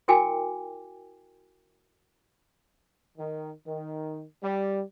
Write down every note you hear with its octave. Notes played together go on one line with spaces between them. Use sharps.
E4 F#4 A#4 G5 G#5 D6
D#3
D#3
G3